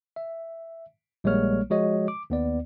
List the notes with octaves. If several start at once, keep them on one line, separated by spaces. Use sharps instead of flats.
E5
A#1 G3 G#3 A#3 C#5 F6
F3 G#3 F#4 C#5 D#5
D6
D#2 B3 D5